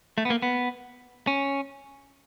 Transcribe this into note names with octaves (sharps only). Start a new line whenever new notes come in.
A3
B3
A#3
B3
C#4